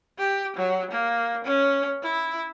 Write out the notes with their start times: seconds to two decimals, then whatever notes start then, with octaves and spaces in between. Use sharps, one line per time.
0.18 G4
0.56 F#3
0.91 A#3
1.44 C#4
2.02 E4